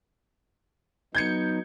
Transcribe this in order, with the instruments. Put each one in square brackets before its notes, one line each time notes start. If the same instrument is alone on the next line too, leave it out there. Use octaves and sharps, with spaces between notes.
[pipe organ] F#3 B3 D#4 [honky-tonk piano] G6 G#6 C#7